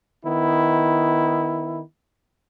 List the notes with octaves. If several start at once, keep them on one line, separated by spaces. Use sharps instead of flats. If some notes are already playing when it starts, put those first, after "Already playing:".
D#3 B3 E4